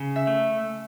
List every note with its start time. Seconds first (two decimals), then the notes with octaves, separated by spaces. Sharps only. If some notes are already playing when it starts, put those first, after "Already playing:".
Already playing: C#3
0.16 E5
0.27 A3